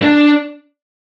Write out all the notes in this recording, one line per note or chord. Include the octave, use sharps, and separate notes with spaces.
D4